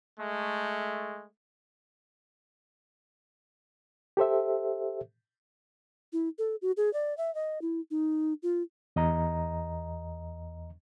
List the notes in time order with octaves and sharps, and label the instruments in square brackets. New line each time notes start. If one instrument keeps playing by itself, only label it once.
[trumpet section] G#3 A3
[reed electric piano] G4 A4 C5 E5
[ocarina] E4
A4
F#4
G#4
D5
E5
D#5
E4
D#4
F4
[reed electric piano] E2 D#5 A#5